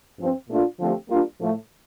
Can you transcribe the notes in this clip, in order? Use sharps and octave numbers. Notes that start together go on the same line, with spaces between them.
G2 F3 C4
A#2 A3 D4 F4
D3 F3 A3 C4 G4
G3 A#3 D4 F4
A2 F3 A3